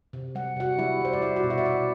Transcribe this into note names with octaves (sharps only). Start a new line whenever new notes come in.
C3
G3 F#5
C3 F#4 F#5
G3 E4 E5
G3 C5
D5
G3 E4 E5
F#4 F#5
B2
E4 E5
D5
B2 E4 E5